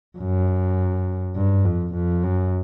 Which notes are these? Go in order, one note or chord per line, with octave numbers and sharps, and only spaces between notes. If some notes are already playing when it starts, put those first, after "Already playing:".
F#2
G2
F2
F2
F#2